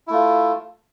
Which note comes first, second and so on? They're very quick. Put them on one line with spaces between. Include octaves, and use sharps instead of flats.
E4 A3 F4